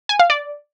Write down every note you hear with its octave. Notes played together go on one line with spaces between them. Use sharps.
G#5
F5
D5